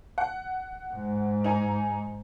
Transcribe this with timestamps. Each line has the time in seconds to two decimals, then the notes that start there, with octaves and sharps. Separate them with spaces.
0.18 F#5
0.94 G#2
1.44 D#4 G#5 A#5